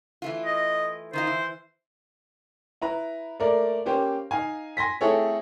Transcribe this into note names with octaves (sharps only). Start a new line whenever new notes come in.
E3 A3 F4
D#5
D#3 D#4 F4 C5
E3
E4 B4 A#5
A3 A#3 A#4 D5
A#3 C#4 G4 C5
D#4 F5 G#5
G#5 C6 A#6 B6
A3 C4 E4 G#4 A4 C#5